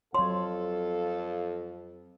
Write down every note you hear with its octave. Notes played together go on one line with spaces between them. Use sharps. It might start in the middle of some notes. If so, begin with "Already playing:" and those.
F2 F#3 A4 C#5 F5 C6